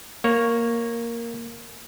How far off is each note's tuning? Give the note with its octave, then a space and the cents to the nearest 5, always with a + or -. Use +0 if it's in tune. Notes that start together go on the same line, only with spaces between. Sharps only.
A#3 +0 C#5 +0